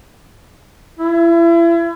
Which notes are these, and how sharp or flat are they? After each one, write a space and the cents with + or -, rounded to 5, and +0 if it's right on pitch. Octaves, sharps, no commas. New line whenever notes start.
E4 +35